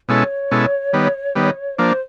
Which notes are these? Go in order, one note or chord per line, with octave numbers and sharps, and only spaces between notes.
B2 G#3 C#4 E4 A4 C#5
B2 G#3 C#4 E4 A4
D#3 G3 B3
D#3 G3 B3
F3 A#3 D4 C5